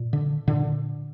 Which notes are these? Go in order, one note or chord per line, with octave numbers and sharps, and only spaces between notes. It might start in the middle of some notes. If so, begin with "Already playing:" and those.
Already playing: A#2
D3
A#2 D3